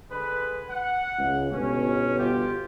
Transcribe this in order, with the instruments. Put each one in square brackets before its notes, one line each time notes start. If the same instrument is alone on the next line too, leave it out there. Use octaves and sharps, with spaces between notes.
[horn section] D3 G#3 B4
F#5
[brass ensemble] C#2
[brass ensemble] G1 B2 [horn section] C#4
[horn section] F4 G4